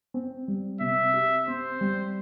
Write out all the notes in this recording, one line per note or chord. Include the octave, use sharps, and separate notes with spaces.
C4
G3
C3 E5
G4
C4 C5
G3